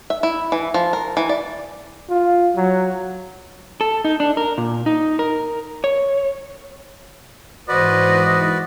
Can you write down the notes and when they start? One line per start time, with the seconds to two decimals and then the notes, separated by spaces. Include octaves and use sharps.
0.10 E5
0.23 E4
0.52 E3
0.74 F3
0.93 A#4
1.17 E3
1.29 D5
2.10 F4
2.56 F#3
3.81 A4
4.05 D#4
4.20 D4
4.37 A#4
4.58 A#2
4.86 D#4
5.19 A#4
5.84 C#5
7.68 G#2 E3 F#4 B4 C5 D5 D#5